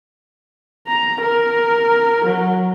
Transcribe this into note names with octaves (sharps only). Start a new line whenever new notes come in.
A#5
A#4
F#3